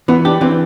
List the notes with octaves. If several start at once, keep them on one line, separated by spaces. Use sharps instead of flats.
E3 B3
D4 G4
E3 C4